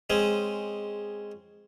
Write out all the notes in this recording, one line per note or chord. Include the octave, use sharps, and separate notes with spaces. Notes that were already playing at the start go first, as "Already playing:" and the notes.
G#3 C4 C#4